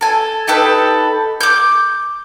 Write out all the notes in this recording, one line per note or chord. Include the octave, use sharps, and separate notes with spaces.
A4 G#5
D#4 G4 A4 B4
D6 G6